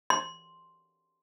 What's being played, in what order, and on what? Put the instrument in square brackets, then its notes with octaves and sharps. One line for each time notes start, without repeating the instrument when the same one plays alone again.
[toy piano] C6